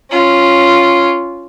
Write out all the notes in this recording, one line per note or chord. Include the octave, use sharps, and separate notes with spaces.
C#4 F4